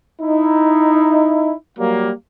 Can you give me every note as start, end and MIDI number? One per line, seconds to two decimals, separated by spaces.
0.22 1.53 63
0.22 1.53 64
1.78 2.11 54
1.78 2.11 55
1.78 2.11 58